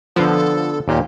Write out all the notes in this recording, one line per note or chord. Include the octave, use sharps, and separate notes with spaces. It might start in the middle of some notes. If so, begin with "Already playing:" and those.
D3 F3 B3 A4
D#2 A#2 A#3 G4